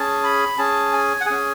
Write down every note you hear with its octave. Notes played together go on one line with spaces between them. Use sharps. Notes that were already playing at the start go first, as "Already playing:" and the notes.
Already playing: C#4 G#4 A5
B5
C#4 G#4 A5
G#5
F#5
C#4 G#4 G#5